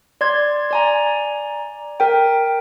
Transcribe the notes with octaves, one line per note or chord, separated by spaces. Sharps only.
D5 C6 G#6
D5 G#5 A#5
A#4 G5